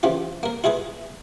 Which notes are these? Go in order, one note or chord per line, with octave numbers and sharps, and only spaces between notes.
C#3 E3 F3 F4 G4
A#3 A#4
E4 F4 G#4 B4